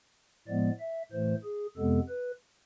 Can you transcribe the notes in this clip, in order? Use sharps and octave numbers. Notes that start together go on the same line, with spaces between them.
A2 F3 G#3 B3 D5
E5
A2 E3 A3 C5
G#4
F2 C3 G#3 B3 A4
B4